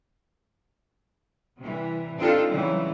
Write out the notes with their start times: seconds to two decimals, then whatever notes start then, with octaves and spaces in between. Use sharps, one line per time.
1.59 C3 E3 G3
2.18 C4 D4 D#4 F4 G4 A4
2.48 C#3 E3 F#3 G3 C4